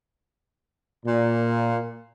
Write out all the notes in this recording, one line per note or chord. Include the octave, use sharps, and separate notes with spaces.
A#2